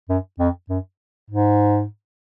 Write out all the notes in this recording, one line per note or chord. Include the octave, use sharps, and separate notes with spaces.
F#2
F2
F#2
G#2